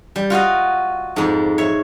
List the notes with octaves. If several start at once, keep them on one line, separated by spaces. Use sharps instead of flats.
G3
F4 F#4 D#5 F5
F2 G#2
C#5 E5